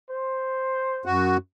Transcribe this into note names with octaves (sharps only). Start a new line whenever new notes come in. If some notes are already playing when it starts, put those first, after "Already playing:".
C5
F#2 F#4